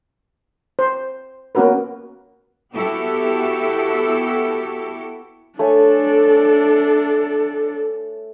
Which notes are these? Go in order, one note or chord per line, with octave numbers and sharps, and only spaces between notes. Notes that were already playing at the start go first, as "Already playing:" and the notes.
C5
A#3 B3 C#4 F#4 A#4 B4
B3 E4 F#4 G4 A4
A3 D4 A4 C#5 G#5